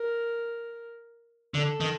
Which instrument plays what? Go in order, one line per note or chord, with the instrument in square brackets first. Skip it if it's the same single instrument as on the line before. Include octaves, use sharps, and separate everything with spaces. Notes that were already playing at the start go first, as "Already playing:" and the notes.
Already playing: [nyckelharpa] A#4
[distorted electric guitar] D3 [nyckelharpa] A4
[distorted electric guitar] D#3